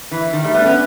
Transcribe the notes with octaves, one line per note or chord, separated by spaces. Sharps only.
E3
D#3
G3 A3
A3 B3
D4
B3 C#4